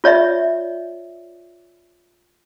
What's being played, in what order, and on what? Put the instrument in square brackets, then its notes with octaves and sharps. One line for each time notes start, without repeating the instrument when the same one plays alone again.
[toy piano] F4 C#5 D5 E5